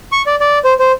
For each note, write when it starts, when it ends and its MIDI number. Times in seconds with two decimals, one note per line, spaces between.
0.12 0.22 85
0.26 0.35 74
0.40 0.59 74
0.64 0.73 72
0.79 0.92 72